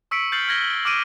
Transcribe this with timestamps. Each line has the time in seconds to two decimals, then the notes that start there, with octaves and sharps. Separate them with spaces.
0.11 C#6 E6 B6 C#7 D7
0.32 F6 G6 A6 C7 C#7 F#7
0.48 F6 G#6 A#6 G7
0.71 D7
0.85 D6 F6 D7 D#7